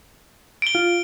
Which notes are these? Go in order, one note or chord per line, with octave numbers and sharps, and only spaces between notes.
D7 G7
F4